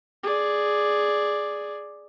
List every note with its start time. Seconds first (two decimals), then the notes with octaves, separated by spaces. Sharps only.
0.23 G#4 D5